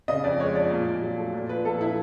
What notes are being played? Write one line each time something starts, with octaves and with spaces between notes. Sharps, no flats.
C#3 D#5
F2 D5
G#3 C#5
F3 D5
A#2
A#2
F#3
A3
A#2
F3 B4
A#2 A4
F3 E4